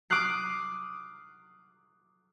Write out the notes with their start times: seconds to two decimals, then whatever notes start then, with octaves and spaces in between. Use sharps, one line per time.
0.10 D6 D#6 F6 F#6 C7